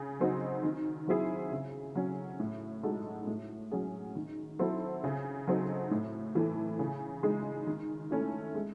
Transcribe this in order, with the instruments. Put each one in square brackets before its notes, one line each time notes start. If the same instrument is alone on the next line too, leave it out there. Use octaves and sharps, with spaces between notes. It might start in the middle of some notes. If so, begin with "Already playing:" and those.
Already playing: [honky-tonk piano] C#3
F#3 C4 D#4 F#4
D#3
F#3 C4 E4 G#4
C#3
F#3 C#4
A2
G#3 D#4 F#4 A4
A2
F#3 C#4 G#4
D#3
F#3 C4 E4 A4
C#3
F#3 C4 D#4 A4
A2
E3 A3
C#3
G#3 D#4 G#4
D#3
A3 C#4 E4
G#3